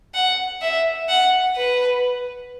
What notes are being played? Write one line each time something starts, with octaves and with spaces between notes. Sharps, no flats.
F#5
E5
F#5
B4